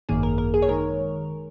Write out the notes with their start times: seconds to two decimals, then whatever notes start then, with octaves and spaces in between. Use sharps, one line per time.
0.09 G#1 F#2 D#3 A#3 G#4
0.23 A#4
0.38 A#4
0.54 G#4
0.62 C#5
0.69 D#3 G#3 A#4